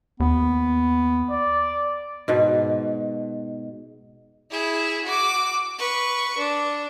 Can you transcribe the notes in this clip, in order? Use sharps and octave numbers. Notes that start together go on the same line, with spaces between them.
D#2 B3
D5
G#2 B2
E4 G#4
F#4 D6
B4 C#6
D4